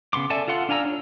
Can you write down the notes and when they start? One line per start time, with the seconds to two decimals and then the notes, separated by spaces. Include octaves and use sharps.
0.13 C#3 B3 C6 D6
0.30 A4 D5 E5 G#5 A5
0.48 F4 A4 F#5 C6
0.69 D4 F5 G#5 A#5 E6
0.85 D4 F4 C#5